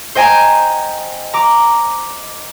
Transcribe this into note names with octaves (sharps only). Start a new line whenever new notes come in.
C5 D#5 G5 G#5 A#5
A#5 D6